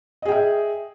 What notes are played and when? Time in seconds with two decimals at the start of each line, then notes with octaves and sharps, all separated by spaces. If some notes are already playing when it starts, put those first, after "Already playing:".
0.22 D#5
0.25 G#4
0.29 G5
0.32 E5